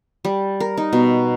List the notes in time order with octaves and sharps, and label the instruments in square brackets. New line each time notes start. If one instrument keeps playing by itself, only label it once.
[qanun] G3
A#4
D#4
B2